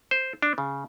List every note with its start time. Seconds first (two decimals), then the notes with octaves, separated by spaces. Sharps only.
0.11 C5
0.42 D4
0.58 C#3